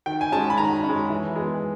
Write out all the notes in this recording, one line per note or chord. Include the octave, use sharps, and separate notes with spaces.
D#3 G5
G#5
G#3 C#4 A5
B5
D#3 A#5
C#4
G#3
E3
G#3 B3